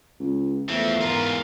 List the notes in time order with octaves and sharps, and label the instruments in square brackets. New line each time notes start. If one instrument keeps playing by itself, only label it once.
[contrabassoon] C#2
[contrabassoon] E2 [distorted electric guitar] F3 C4 [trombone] A3
[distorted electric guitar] G#2 F4 [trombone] A#4